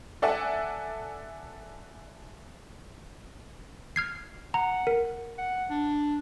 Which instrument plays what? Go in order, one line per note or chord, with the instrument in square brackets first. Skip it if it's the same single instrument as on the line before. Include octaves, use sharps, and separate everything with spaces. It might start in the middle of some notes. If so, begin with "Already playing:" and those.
[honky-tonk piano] A4 D5 E5 F#5 G#5
[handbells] F6 G#6 C7
[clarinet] F#5 [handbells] A#5
[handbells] A#4
[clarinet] F#5
D4